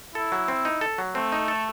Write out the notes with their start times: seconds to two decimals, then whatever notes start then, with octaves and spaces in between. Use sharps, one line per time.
0.14 E4 A4
0.32 F#3
0.48 C4
0.65 D#4
0.81 A4
0.98 F#3
1.15 A3 C4
1.32 D#4
1.48 A4